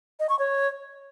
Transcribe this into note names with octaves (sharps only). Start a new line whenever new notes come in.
D#5
C#6
C#5